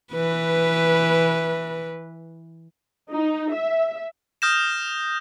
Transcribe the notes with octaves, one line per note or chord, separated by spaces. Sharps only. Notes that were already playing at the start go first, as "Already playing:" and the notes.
E3 B4
D#4
E5
D#6 F6 G6 A#6 E7